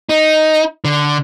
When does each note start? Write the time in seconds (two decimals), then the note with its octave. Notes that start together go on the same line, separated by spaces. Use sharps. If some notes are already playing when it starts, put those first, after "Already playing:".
0.09 D#4
0.85 D3